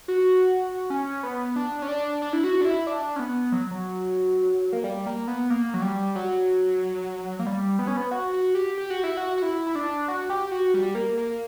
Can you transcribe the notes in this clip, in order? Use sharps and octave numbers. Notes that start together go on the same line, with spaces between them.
F#4
C#4
B3
D4
C#4
D4
D4
E4
F#4
D4
E4
D4
C#4
B3
F#3
F#3
A#3
G3
A#3
B3
A#3
F#3
G3
F#3
A#3
G3
B3
C#4
B3
F#4
F#4
G4
G4
F#4
E4
F#4
F#4
E4
E4
D4
F#4
G4
F#4
G3
A#3
A#3